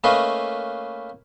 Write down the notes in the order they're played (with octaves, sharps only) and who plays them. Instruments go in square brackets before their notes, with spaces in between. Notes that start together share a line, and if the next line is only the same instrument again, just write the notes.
[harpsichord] A3 A#3 C#4 B4 D#5 F5